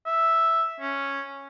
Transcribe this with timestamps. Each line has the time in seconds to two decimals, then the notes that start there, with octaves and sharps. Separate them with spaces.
0.06 E5
0.80 C#4